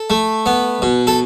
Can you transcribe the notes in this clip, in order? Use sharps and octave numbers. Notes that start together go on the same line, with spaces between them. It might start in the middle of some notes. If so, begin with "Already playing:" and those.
Already playing: A4
A3
B3
B2
A4